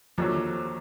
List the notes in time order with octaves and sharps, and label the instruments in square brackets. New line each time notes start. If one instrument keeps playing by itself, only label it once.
[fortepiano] D#2 D3 F#3 [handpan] F3